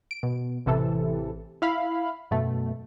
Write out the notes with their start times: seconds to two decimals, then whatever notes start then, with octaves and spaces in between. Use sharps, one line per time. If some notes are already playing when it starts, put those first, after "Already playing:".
0.11 D7
0.23 B2
0.66 A1 C3 E3 A4
1.62 E4 F5 B5
2.31 F#2 B2 A3